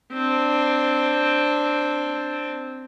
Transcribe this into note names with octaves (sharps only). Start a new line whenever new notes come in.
C4 D4